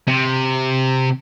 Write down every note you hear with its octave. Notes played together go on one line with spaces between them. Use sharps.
C3